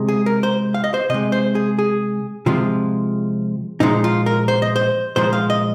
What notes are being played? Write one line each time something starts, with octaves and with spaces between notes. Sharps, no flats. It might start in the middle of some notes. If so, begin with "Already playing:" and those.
Already playing: C3 G#3
G#4
A#4
C5
F5
D#5
C5
C3 G#3 D#5
C5
G#4
G#4
C3 F3 G#3 F4
A#2 F3 G#3 D#4
F4
A#4
C5
D#5
C5
A#2 F3 G#3 C5
F5
D#5